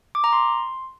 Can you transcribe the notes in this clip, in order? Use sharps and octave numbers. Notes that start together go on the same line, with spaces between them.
D6
A#5
C6